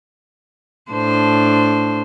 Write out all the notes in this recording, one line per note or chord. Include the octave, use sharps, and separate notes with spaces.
A2 D4 C5